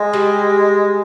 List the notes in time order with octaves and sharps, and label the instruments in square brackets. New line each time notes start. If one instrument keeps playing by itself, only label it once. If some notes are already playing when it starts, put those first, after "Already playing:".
Already playing: [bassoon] G#3
[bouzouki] G3